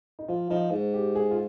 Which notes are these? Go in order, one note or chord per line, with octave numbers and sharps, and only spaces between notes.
D#4
F3 F4
F3 D#4
G#2
G4
G#4
F4